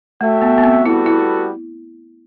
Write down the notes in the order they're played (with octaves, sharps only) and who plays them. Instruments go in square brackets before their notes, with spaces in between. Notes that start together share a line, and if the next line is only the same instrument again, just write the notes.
[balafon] A3 [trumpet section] F#4 A4 E5 G5
[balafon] B3
B3
C4
[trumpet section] G3 B3 F#4 A4 [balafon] E4
[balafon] E4